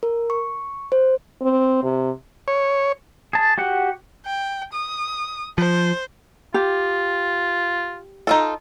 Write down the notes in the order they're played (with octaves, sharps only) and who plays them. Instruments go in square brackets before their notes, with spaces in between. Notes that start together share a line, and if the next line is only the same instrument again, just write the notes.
[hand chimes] A#4
C#6
C5
[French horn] C4
C3
[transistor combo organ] C#5
[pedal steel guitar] G#4 A5
F#4 G4 F#5
[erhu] G5
D#6
[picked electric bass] F3 [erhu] C5
[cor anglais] F4 [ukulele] G4
[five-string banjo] D#4 F4 A4